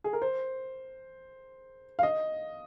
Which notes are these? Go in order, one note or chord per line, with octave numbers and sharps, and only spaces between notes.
G#4
A#4
C5
F5
D#5